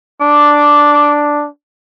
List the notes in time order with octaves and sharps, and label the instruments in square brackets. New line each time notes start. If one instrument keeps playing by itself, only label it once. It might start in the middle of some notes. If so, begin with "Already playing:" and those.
[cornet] D4 [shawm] D6